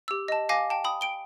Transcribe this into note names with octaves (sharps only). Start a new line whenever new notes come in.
G4 E6
D#5 A5
F5 G#5 D6 A#6
G5 A5
G5 B5 D#6
G5 D7 G7